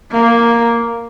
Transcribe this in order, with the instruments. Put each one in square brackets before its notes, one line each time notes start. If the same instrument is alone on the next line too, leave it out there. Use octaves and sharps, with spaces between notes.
[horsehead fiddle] A#3